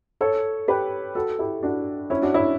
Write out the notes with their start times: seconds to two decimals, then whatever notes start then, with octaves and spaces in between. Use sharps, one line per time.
0.21 A4 C#5
0.68 G4 B4
1.15 F#4 A4
1.39 E4 G4
1.63 D4 F#4
2.10 C#4 E4
2.22 D4 F#4
2.34 C#4 E4